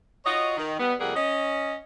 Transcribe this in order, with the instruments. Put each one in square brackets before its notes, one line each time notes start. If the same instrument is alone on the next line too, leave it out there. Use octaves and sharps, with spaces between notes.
[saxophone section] F4 F#4 C#5 D#5
D#3
G3 B3
F2 C3 G3 A#3 G#4 F#5
C#4 D#5